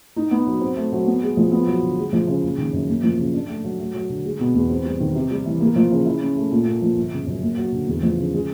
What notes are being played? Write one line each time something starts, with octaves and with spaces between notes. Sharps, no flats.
D#4
B3
F#3
C4
A3
F#3
B3
G#3
F3
B3
F#3
D3
G#3
F3
C#3
F#1
D#3
F#2
A#3
F3
C#3
D4
A3
F#3
A3
F#3
D3
G#3
B2
E2
C4
G3
D#3
C3
G3
E3
A#3
F3
C#3
E4
C#4
A3
A#2
A#3
F3
G1
C#3
F#2
A#3
F#3
D3
E2
F3
C#3
G#3